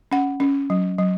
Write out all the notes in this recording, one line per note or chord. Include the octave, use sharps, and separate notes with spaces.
C#4 F#5
C#4
F#3
F#3